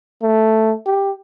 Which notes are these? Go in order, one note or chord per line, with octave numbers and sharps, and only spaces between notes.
A3
G4